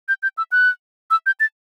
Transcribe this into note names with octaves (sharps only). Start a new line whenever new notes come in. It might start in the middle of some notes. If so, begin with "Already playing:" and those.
G6
G6
E6
F#6
E6
G6
A6